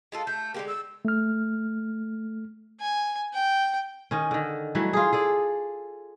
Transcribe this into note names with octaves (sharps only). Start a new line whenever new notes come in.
G#3 F4 A4
A3 G6
D3 G#3 A#3 G4
E6
A3 F6
G#5
G5
D#3 C#4
D3 D#3
E3 F#3 G3 A3
F4 G#4
G#4 A4 D5